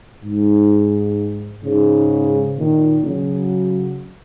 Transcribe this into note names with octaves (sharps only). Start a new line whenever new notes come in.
G#2
G#2 C#3
A#2 D#3
C#3 F#3